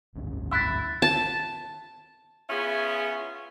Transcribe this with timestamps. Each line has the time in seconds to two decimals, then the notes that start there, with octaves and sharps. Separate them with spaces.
0.15 G#1 D2 C#4
0.51 E4 E6 F#6 A6
1.02 A5
2.50 B3 C#4 E4 F4 G#4